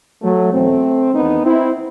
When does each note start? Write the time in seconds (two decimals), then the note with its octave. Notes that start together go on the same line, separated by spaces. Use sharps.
0.22 F#3 A3
0.53 E2 B2 A3 C4
1.13 E2 D#3 B3 D#4
1.44 C4 E4